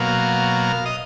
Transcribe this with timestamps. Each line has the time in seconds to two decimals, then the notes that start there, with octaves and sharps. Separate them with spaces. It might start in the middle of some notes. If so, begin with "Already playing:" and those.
Already playing: B2 F#3 A#3 F5
0.86 D#5